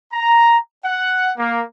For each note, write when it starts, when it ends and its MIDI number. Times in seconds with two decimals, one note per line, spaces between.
0.13 0.58 82
0.84 1.31 78
1.38 1.63 58